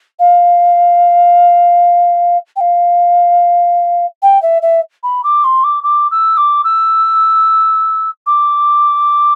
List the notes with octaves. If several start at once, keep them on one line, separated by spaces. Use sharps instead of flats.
F5
G5
F5
G5
E5
E5
B5
D6
C6
D6
D6
E6
D6
E6
D6